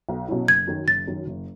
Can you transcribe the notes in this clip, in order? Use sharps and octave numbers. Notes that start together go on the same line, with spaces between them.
B1
B2 F#3 C#4 E4
F#1 G#6
F#2 D#3
F#1 A6
F#2 D#3
F#1